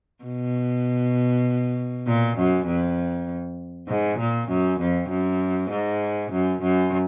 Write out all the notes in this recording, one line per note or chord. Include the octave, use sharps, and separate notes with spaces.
B2
A#2
F#2
F2
G#2
A#2
F#2
F2
F#2
G#2
F#2
F#2